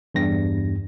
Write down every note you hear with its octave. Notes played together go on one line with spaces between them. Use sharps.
E2 G2 A#6